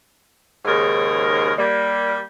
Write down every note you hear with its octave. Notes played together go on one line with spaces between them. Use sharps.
D#2 G#2 C#3 A#4
G3 A#3